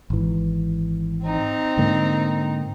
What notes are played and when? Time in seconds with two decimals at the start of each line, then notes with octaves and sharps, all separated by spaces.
0.10 G#1 E3
1.24 C4 D#4
1.77 G#2 D3 A#3